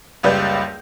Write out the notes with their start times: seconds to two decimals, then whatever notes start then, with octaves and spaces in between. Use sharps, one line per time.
0.23 F#1 C#2 G3 B4 D5 G6